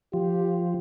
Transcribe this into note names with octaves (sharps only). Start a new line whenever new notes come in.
F3 G4